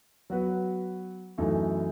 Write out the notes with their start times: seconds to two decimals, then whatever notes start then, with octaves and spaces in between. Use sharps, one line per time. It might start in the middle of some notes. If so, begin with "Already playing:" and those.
0.30 F#3 B3 F#4 B4
1.38 F#2 E3 A3 D#4 A4